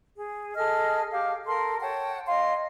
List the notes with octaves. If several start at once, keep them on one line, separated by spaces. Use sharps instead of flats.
G#4
G#4 A4 D#5 F6
G4 F5
A4 A#4 C6
C#5 F#5 G5 A5
D#5 F5 C6